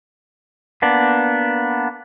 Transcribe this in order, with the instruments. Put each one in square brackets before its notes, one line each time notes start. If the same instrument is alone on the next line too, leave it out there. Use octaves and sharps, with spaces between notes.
[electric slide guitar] A#3 B3 D4